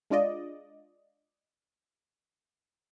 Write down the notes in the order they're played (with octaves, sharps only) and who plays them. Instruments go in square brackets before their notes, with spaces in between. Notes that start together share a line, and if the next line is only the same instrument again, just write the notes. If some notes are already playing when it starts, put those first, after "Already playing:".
[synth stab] G#3 D4 F4 D5 D#5